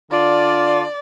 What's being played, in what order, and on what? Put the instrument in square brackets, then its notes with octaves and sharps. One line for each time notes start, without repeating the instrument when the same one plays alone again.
[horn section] D3 D4 F4 [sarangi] D5